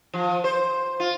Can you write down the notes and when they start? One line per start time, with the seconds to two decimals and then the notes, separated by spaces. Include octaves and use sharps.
0.13 F3
0.44 C5
1.00 F4